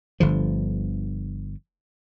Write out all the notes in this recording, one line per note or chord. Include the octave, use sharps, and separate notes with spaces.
G1 D3 F3